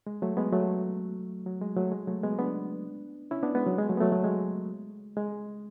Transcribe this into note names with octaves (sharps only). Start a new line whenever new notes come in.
G#3
F#3 A3
G#3 B3
F#3 A3
F#3
G#3
F#3 A3
G#3
F#3 A3
G#3 B3
B3 D4
C#4 E4
B3 D4
G#3 B3
F#3
G#3
F#3 A3
B3
F#3 A3
F#3
G#3
G#3